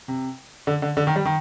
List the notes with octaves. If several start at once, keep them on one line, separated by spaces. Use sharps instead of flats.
C3
D3
D3
D3
D#3
G3
D#3